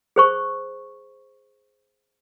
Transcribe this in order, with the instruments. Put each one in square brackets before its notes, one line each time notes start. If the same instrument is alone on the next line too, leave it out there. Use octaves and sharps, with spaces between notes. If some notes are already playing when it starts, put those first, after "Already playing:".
[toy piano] G#4 C5 C#6